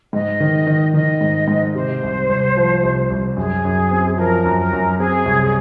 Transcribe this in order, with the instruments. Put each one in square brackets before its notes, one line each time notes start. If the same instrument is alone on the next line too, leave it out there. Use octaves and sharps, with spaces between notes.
[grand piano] G#2 [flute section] D#5
[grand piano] D#3
D#3
[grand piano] D#3 [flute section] D#5
[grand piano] G#2
G#2
[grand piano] C3 [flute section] C5
[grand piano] C2
C2
F3
C2
C2
[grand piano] F#2 [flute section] G#4
[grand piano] F#2
C4
[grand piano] F3 [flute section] A#4
[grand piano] F#2
[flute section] A#4
[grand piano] F#2
[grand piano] C4 [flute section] G#4
[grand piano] C2